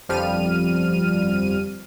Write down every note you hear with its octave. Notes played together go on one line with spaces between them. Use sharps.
G1 F2 F3 G3 F6 D#7